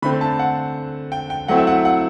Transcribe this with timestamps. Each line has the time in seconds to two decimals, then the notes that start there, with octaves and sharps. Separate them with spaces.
0.02 D3 A3 C4 B5
0.21 A5
0.39 F#5
1.12 G5
1.30 G5
1.48 F#3 A3 C4 E4 F#5
1.57 E5
1.67 F#5
1.85 F#5